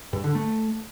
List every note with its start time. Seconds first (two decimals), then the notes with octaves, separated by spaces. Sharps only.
0.13 G2
0.24 D3
0.35 A3